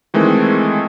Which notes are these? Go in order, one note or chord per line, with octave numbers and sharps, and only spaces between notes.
D#3 E3 G#3 A3 C4